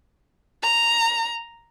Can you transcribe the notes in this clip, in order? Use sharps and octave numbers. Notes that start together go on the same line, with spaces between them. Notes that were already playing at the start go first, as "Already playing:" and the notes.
A#5